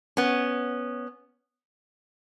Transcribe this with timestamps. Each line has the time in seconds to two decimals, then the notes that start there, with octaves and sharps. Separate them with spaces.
0.17 B3 C#4